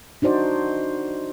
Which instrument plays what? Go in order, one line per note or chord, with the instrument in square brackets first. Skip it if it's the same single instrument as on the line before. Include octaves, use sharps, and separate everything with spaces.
[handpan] D4 D#4 F#4 C5 D5